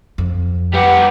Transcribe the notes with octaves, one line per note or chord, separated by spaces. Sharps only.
F2
G3 G4 B4 F#5